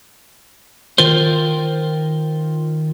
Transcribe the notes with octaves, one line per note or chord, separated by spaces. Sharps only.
D#3 F4 A#4 C5